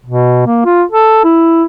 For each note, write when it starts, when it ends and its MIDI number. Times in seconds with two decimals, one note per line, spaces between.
0.06 0.46 47
0.47 0.63 58
0.65 0.83 65
0.92 1.24 69
1.24 1.64 64